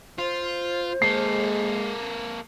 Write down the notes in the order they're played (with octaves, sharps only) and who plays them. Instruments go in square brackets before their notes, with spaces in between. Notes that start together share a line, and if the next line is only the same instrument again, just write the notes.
[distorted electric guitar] F4 [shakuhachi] C5
[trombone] G#3 [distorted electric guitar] A#3 A4 [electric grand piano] C7